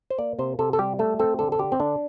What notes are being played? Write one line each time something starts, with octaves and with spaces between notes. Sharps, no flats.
C5
A#3 D5
C3 C5
C3 A4
A4
G3 G4
A3 A4
C4 A4
D3 A4
A4
D3 G4
C4
D3 D4